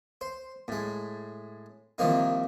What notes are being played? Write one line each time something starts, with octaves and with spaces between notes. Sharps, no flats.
C5
A2 G#3
C2 D#3 F3 A#3 D#4